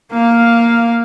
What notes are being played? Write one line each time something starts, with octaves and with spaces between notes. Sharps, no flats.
A#3 F5